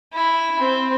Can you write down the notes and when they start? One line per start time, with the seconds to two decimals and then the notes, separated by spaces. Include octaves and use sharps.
0.13 E4
0.59 C4